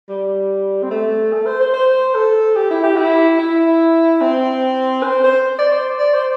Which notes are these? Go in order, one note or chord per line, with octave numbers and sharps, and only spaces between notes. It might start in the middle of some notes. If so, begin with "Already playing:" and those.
G3
C4
A3
A4
C5
C5
C5
A4
G4
E4
G4
E4
E4
C4
C5
C5
D5
C5
D5
C5